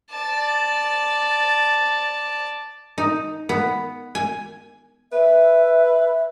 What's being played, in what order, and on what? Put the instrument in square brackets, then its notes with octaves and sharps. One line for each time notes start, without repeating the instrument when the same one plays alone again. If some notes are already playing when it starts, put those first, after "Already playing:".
[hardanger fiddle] D5 A5
[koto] D#4
B3
G#5
[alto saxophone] B4 [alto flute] E5